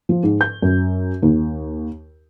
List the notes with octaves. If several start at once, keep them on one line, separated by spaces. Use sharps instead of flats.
F3
G#2
G6
F#2
D#2